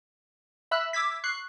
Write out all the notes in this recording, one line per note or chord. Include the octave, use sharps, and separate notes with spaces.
E5 B5 E6 F#6
D6 E6 G#6 B6
C#6 F#6 C7